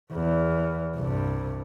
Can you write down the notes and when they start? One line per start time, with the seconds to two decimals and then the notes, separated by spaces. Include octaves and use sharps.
0.13 E2
0.96 C2 G2